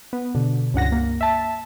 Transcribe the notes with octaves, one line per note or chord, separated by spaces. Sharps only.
B3
B2 D3
C#2 G2 F#5 A#6
A#3
E5 A5